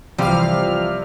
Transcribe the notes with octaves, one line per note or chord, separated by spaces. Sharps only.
C2 C3 E3 F3 G3 F5 F6